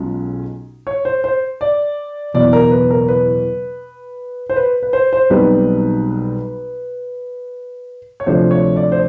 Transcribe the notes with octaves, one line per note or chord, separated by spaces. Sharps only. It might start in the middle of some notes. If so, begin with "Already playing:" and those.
Already playing: B1 B2 G#3 C#4 F4
C#5
C5
C5
D5
F#1 E2 B2 D5
A#4
B4
A#4
B4
C5
B4
B4
C5
C5
B1 B2 G3 C4 D#4 B4
C#5
D2 C3 F3 A3 D4 C5
C#5
D5
C5